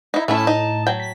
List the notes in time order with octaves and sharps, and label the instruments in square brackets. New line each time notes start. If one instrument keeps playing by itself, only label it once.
[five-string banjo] D#4 E4
[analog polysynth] A2 A5 [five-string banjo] A3 C#4 E4
[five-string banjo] D#4
F#3 G5
[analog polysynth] B6